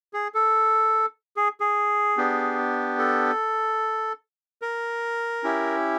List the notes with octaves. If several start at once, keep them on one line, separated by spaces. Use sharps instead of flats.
G#4
A4
G#4
G#4
B3 D4 G4
A4
A#4
C#4 E4 G4